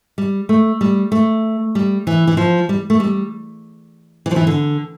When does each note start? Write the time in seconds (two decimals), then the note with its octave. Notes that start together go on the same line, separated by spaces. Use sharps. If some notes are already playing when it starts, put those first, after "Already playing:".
0.18 G3
0.49 A3
0.81 G3
1.12 A3
1.75 G3
2.07 E3
2.27 E3
2.37 F3
2.69 G3
2.90 A3
3.00 G3
4.26 E3
4.31 F3
4.36 E3
4.47 D3